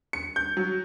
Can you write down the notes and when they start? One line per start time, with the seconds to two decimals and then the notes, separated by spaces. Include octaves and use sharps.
0.13 C#7
0.36 G6
0.57 F#3